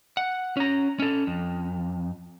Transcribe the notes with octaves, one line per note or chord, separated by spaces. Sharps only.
F#5
C#4 A#5
C#4 A4
F2